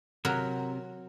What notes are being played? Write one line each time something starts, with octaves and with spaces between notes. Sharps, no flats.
C3 F#3 A#4